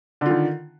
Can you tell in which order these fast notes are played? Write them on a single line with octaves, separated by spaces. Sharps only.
D3 F4 D#3